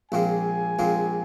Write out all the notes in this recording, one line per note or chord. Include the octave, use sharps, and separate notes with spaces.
A#1 A#2 G#3 C4 F4 G#5
A#1 A#2 G#3 C4 F4